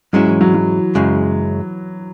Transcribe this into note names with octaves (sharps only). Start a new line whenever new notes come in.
G#2 F#3 G#3 C#4 E4
E3
F#3
F#3
F#2 C#3 G#3